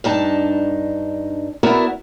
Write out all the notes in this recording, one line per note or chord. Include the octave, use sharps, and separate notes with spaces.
G2 D4 D#4 A5
B3 E4 F#4 A#4 D5 E5